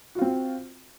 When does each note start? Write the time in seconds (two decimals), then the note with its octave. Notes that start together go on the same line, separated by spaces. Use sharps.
0.15 F#4
0.18 F4
0.21 C4